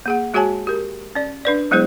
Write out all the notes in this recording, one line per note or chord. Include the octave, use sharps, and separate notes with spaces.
A#3 G#4 F#5
G#3 F#4 G#4 C#5 G#5 A5
G4 A#4
C#4 D5
D4 B4 D5
F#3 G#3 B3 E4 G#4 C5